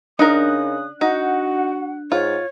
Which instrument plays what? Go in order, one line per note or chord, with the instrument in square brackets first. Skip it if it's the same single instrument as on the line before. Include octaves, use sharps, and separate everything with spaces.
[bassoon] C#3 [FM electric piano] D4 F#6 [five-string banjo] D#4 A#4 [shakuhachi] D#6
[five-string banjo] D#4 [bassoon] F#4 [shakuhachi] F#5
[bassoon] G#2 [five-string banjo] F4 [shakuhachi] C#5